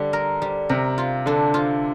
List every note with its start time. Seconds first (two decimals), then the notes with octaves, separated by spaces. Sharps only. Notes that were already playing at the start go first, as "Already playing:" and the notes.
Already playing: D3 G3
0.13 A#4
0.42 G3
0.69 C3 A#4
0.98 F4
1.26 D3 D4
1.54 F4